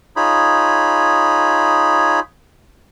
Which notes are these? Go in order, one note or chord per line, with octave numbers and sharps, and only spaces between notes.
D#4 F4 G#4 C#5 B5